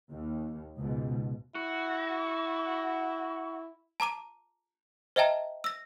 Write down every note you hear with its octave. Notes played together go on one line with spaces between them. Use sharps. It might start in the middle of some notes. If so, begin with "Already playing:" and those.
D#2
C#2 G#2 B2
E4 F#4
A5 A#5 D6 D#7
C5 D#5 E5 G5 A5 A#5
E6 A#6